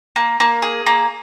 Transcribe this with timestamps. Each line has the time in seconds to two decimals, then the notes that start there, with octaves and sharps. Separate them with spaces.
0.16 A#3
0.40 A#3
0.62 G#4
0.86 A#3